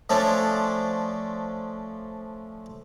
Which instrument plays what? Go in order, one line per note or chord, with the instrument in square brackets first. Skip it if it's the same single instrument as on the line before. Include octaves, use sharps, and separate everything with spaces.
[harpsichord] F3 A3 C#4 D4